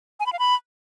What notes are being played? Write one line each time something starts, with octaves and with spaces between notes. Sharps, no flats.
G#5
B5
F5
B5